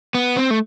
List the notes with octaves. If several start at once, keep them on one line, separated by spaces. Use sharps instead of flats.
B3
C4
A3